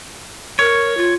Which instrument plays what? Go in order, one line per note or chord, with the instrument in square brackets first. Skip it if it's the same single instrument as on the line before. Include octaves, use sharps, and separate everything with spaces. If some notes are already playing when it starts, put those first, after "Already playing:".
[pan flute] A#4 [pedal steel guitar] C#5
[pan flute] F4